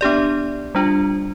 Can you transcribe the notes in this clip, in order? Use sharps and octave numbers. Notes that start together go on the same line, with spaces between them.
B3 D4 G4 D5
G3 D4 F4